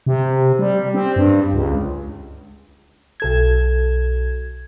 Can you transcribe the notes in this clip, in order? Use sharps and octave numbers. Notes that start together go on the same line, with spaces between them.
C3
G3
C4
G2
C#2
B1 A4 G#6